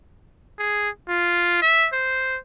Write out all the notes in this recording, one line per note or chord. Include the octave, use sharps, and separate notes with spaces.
G#4
F4
E5
C5